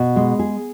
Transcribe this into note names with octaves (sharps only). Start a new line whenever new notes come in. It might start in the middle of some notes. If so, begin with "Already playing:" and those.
Already playing: B2
G#3
G#4